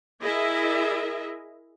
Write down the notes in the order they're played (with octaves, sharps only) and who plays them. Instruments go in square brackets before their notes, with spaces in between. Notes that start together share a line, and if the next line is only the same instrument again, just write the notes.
[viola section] E4 G#4 A#4 D#5 E5